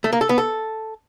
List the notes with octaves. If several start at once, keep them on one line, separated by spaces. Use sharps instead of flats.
A3
A#3
A4
B3
A4